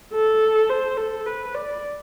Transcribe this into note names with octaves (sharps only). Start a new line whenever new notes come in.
A4
C5
A4
B4
D5